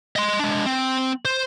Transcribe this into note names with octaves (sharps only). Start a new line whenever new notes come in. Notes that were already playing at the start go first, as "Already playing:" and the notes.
D#5 C6
G#3 D4
C4
C5